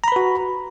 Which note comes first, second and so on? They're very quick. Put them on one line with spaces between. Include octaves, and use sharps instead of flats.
A#5 B5 B4 F#4